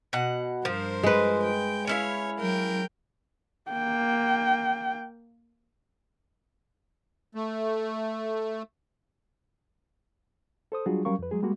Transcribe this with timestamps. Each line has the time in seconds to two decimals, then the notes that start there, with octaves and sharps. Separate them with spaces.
0.13 B2 F#5
0.65 G2 F3 A#4 C5
1.03 G#3 B4
1.43 G5
1.87 C#4 E4 C#5 F5
2.39 F#3 A#4 G5
3.71 A#3 G5
7.35 A3
10.72 A4 C5 D#6
10.86 F#3 G3 D4 F4 F#4 G#4
11.05 F#3 G3 C#4 A#4 F5 C#6
11.19 F2 B4
11.31 F#3 G#3 G#4
11.43 G3 G#3 A#3 F#4